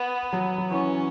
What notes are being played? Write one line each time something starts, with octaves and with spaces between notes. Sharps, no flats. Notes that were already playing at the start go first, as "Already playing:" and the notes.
Already playing: B3
F#3
F#3
E3 C#4